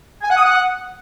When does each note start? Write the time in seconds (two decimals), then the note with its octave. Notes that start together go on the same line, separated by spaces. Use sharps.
0.23 G#5
0.30 F#5
0.37 D#6
0.44 F#5